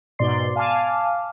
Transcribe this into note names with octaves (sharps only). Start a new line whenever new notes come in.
G#2 B2 D5 C6 C7
F5 G#5 A5 D6 F6